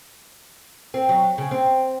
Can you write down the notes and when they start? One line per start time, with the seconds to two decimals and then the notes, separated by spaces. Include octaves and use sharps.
0.94 C4
1.09 F#3
1.38 C#3
1.51 C4